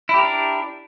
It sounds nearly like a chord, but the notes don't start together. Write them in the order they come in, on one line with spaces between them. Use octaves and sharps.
E4 G4 A#4 D4